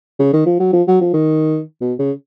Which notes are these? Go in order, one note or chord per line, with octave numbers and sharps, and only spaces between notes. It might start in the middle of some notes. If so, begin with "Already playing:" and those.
C#3
D#3
F3
F#3
F3
F#3
F3
D#3
B2
C#3